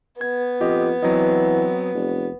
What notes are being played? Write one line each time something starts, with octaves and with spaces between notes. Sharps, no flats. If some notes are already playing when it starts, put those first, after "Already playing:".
B3 G#6
F2 F4 G4 D#5
E3 F#3 C4 D#5
F1